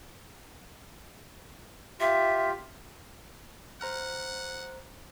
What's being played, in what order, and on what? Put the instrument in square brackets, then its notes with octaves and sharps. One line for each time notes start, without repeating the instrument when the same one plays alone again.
[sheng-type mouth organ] F4 G4 [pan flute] E5
[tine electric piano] C5 A#5 F6 [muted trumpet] F#5